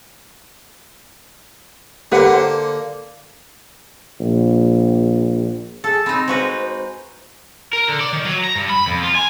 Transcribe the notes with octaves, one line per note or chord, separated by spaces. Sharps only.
D3 A#3 G4 B4 F#5
C5
A#1
G#4 A4
C4 D#4 B5
G#3 F#4 B4 C5
A#4
D3
D5
D#3
F#3
A#5
G2
B5
F2
F4
G#5